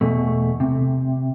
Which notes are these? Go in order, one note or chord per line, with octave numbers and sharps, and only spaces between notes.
E2 B2 A3
C3